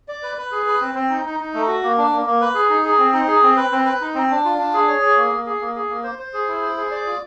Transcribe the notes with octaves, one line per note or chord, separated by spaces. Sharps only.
D5
B4
B4
G#4
B4
C4
C4
D#4
D#4
D#4
A3
F#4
A#3
D4
A#3
A#3
B4
G#4
D#4
G#4
C4
D#4
G#4
C4
B4
C4
B4
D#4
C4
D4
F4
D4
G#4
C#5
G#4
A#3
A#3
G#4
A#3
G#4
A#3
C5
C5
G#4
E4
C5
G#4
D5
F4